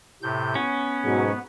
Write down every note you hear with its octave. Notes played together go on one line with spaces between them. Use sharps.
A2 C3 G6
B3 C#4
G#2 B2 F#3